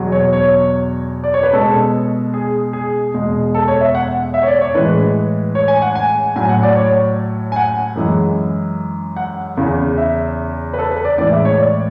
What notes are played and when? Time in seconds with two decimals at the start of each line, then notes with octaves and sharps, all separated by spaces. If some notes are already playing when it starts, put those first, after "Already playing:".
Already playing: E2 B2 F#3
0.12 C#5
0.33 C#5
1.24 D5
1.34 C#5
1.43 B4
1.53 B2 G#3 A4
2.34 G#4
2.73 G#4
3.14 E2 B2 G#3
3.54 A4
3.68 C#5
3.81 E5
3.95 F#5
4.34 E5
4.43 C#5
4.48 D5
4.61 C#5
4.75 A2 E3 G#3 B4
5.55 C#5
5.68 G#5
5.82 F#5
5.95 G#5
6.36 A2 F#3 G#5
6.49 F#5
6.63 D5
6.75 C#5
7.52 G#5
7.56 F#5
7.96 F#2 E3 G#3
9.17 F#5
9.57 E2 C#3 E3
9.98 E5
10.74 B4
10.79 A4
10.91 B4
11.05 D5
11.18 A2 E3 G#3 D5
11.32 E5
11.45 C#5
11.58 D5